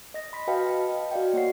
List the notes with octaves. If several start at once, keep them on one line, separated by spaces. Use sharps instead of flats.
D#5 A#6
B5 C6 B6
F#4 B4 D#5 F5 G5 A5
D#5
F#4 D5 F5 G5
A#3 C#5 F#5 C7